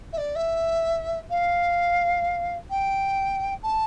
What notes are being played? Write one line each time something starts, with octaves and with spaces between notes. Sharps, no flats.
E5
D5
E5
F5
G5
A5